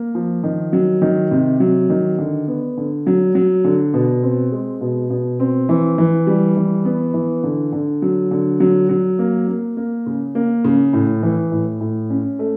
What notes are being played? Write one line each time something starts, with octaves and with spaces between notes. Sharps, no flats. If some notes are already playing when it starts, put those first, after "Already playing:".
Already playing: A#3
F3
D#3
F#3
D#3
C3
F#3
D#3
D3
B3
D3
F#3
F#3
D3
B2
C4
G#3
B2
B2
C4
E3
E3
G3
E3
B3
E3
D3
D3
F#3
D3
F#3
F#3
A#3
A#3
A#3
C#3
A#3
C#3
A2
E3
A2
A2
C#4
A3